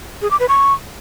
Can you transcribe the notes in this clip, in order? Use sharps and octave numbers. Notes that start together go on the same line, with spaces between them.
G#4
D6
B4
C#6